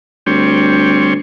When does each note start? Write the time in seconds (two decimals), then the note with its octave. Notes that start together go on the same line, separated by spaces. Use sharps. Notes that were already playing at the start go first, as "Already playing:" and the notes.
0.26 D2 G3 C4 C#5